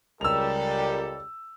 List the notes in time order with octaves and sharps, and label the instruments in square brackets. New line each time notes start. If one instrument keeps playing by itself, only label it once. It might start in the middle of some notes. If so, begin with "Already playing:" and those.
[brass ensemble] C#2 G3 A4 [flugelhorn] A#4 [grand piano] E6 F7